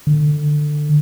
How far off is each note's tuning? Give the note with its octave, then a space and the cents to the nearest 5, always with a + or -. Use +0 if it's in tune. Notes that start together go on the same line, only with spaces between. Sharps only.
D3 +15